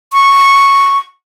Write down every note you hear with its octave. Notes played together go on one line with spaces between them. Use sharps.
C#6